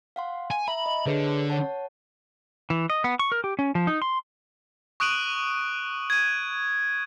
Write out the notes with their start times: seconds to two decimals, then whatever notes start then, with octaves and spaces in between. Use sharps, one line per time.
0.16 F5 F#5 C6
0.51 G#5
0.68 E5 A#5 B5
0.86 D#5
1.06 D3 G#4 B4 C#5
1.50 C#5 F#5 A5
2.70 E3
2.90 D#5
3.04 B3
3.19 C#6
3.32 A#4
3.44 G4
3.59 C#4
3.75 F3
3.87 D#4
4.02 C6
5.00 C#6 D#6 F#6 D7 D#7 F#7
6.10 G#6 D#7